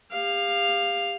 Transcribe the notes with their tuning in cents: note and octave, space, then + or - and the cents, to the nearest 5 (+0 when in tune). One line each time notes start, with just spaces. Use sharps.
G4 +35 F5 +0